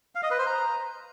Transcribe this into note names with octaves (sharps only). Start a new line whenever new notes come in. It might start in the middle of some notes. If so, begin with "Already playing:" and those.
F5
D#5
B4
C5
A#5